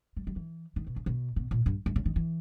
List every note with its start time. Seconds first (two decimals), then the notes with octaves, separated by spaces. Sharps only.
0.16 G3
0.27 G3
0.36 E3
0.76 D#3
0.87 B2
0.96 C#3
1.06 B2
1.36 B2
1.51 A#2
1.66 G2
1.86 G2
1.96 C#3
2.06 D#3
2.16 E3